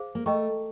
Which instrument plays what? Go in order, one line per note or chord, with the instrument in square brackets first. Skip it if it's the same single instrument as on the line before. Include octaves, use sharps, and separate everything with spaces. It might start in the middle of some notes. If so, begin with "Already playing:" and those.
Already playing: [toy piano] G#4 C5 F5
[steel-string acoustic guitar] A#3
[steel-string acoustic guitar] A3 [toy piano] A#4 D#5 G5 A#5 C#6